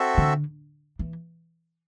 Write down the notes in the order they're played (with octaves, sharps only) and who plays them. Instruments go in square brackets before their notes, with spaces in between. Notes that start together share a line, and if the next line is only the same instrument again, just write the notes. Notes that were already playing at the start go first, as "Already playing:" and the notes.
Already playing: [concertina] C4 F#4 A4 E5
[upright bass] D3
E3